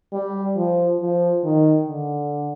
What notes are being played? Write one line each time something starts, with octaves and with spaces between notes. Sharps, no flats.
G3
F3
F3
D#3
D3